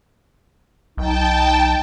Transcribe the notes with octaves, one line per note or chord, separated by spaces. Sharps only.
B1 D#4 G5 A5